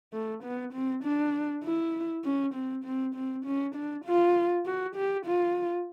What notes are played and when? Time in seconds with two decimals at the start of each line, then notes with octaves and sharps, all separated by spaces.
0.13 A3
0.44 B3
0.73 C4
1.04 D4
1.64 E4
2.24 C#4
2.54 C4
2.84 C4
3.15 C4
3.45 C#4
3.75 D4
4.05 F4
4.65 F#4
4.96 G4
5.26 F4